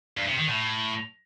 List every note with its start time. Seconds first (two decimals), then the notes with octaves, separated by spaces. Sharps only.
0.17 G2
0.28 C3
0.38 D#3
0.48 A2